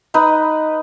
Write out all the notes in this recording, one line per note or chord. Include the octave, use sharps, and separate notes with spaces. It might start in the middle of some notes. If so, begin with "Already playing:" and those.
D#4 B4 D#5 B5